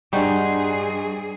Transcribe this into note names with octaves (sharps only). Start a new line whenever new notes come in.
G2 G3 D4 D#4 F#4 G#4 C5 C#6